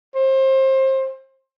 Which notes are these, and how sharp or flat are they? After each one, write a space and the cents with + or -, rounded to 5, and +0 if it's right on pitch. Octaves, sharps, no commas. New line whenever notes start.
C5 +25